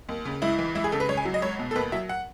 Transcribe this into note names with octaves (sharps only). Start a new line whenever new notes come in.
D#2
C#3
C#2 E4
E3
C#2 E4
G#4
C#3 A4
B4
C#2 C#5
G#5
F#3
D#5
C#2 C#5
B2
A4
D#2 B4
F#3 E5
F#5